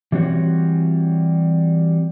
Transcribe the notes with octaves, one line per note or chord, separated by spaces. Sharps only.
E3 G3 C4 F#4 C#5